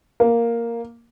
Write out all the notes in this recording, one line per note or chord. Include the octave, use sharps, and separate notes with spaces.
A#3